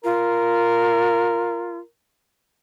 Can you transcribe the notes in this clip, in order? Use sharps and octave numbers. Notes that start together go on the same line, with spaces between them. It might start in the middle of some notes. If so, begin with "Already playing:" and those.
F4 A#4